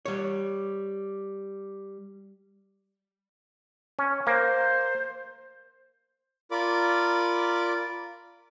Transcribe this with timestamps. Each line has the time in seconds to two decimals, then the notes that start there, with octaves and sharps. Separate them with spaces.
0.06 G3 C#5
3.99 C#4
4.27 A#3 C5
6.51 F4 A#4 D5 B5 D6